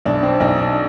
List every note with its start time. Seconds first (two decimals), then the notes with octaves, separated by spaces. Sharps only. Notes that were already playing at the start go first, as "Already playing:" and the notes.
0.05 B1 D4
0.23 C4
0.40 B1 D#4
0.58 D4